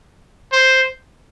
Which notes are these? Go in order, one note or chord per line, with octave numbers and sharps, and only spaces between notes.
C5